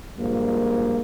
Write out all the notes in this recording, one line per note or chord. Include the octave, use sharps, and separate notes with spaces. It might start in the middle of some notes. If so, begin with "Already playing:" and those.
G2 A#2 F3 G#3 A#3